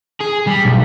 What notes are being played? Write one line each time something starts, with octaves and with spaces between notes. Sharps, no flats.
G#4
G3
B1